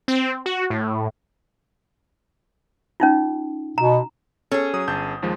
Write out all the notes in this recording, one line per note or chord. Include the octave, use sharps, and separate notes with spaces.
C4
F#4
A2
C#4 D#4 F4
B2 A#5
C#4 G#4 A4
F#3 D#6
G1 A5 G6
D#2 F3 G#3